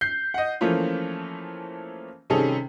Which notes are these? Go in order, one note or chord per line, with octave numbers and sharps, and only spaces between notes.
G6 C7
D#5 F#5
E3 F3 A3 A#3 C#4 F4
C3 D#3 G3 C#4 G#4 A4